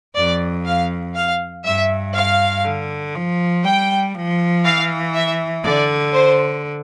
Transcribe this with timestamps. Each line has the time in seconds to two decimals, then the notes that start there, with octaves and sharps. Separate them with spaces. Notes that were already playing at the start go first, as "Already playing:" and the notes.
0.16 F2 D5
0.66 F5
1.15 F5
1.65 G2 E5
2.15 F5
2.65 D3
3.15 F3
3.64 G3 G5
4.15 F3
4.64 E3 F5
5.14 E5
5.64 D3 D5
6.14 C5